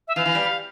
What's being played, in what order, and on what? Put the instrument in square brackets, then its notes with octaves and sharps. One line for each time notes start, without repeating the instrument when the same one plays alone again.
[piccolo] E5
[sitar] E3 [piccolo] F5
[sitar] E3
G3